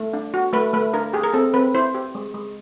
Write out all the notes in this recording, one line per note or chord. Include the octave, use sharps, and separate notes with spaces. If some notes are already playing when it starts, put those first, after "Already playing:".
Already playing: A3
D4
F#4
A3 B4
A3 B4
D4 A#4
G4 G#4
A#4
C4 A4
C4 B4
E4 C5
G4
G#3
G#3